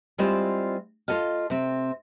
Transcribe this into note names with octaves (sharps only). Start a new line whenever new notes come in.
G3 G#3 C4 E4 F4 C5
F4 G4 A4 D#5 F5
C3 C4